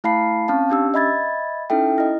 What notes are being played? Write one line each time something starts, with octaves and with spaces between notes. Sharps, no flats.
A3 E4 F5 A5 B5 C7
C4 C#4 F5 A5
C#4 D4 G4 E6
D#5 E5 B5 G#6 A6
C#4 D#4 E4 A4 E5 G5
E4 D#5